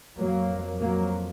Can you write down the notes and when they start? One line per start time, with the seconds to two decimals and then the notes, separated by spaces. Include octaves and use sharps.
0.17 F2 F#3 A#3
0.80 F#3 A#3